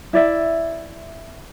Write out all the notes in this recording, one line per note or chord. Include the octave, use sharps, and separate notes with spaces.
E4 D5 E5